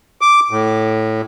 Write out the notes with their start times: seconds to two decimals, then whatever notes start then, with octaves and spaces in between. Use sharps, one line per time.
0.21 D6
0.51 A2